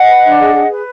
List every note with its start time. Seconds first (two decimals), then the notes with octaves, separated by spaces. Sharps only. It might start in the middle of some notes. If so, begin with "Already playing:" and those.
Already playing: D#5 F#5
0.08 B4
0.23 D4
0.39 G#4
0.53 G#4
0.70 B4